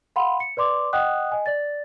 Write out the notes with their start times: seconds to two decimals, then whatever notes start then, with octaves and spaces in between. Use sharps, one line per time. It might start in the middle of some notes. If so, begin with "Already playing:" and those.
0.16 F5 F#5 B5 C6
0.40 C#7
0.57 B4 D5 C6 D6
0.93 D#5 F#5 G5 D#6 F#6
1.32 D#5 G#5
1.46 D5 A6